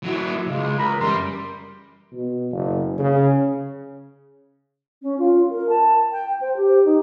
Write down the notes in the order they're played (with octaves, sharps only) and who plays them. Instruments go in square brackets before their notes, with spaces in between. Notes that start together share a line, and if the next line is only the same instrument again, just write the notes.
[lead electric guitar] F#3 E4
[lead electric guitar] C#2 [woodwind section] C#3 G#3
[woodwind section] A#4 A#5 B5
[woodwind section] F#2 E3 C6 [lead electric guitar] G3
[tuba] B2
F#1
C#3
[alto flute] C#4
F4
A#4
A5
G5
C5
G4
D#4